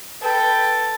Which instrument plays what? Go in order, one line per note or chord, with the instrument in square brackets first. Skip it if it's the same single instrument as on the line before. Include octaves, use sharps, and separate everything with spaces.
[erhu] A4 [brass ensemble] B4 G5